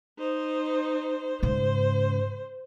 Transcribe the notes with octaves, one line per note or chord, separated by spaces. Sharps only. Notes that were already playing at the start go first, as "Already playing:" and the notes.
D#4 C5
G#2 C#3 C5